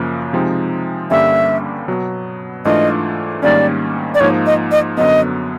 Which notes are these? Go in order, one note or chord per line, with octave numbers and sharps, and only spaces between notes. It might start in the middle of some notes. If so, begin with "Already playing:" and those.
Already playing: F#2 C#3 F3 A#3
C3 F3 G#3 C4 D#4
G2 D3 G3 A#3 C#4 E5
B2 F#3 B3
G#2 E3 A3 D4 F4 D#5
G#2 D#3 G3 A#3 C#4 D5
D5
G#2 F3 A#3 D#4 C#5
D#5
D#5
F#2 D3 F#3 B3 D#5